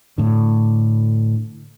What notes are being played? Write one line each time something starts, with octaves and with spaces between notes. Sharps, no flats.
A2 D3